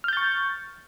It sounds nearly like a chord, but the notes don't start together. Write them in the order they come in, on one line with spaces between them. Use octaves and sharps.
F6 G6 A6 C#6